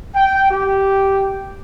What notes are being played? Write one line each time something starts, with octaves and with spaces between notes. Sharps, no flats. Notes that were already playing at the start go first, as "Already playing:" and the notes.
G5
G4